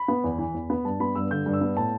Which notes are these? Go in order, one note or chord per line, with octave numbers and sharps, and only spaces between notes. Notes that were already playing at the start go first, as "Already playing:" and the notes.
Already playing: B5
B3
E2
E3
E2
B3
G2 A5
B3 B5
G2 E6
D3 G6
G2
E6
B3
A2 A5